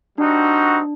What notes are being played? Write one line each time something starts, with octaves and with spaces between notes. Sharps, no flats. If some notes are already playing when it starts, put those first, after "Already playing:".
G3 C4 D4 D#4 F#4